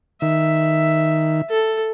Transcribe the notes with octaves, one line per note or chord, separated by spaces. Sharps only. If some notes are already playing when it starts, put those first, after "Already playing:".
D#3 E5
A4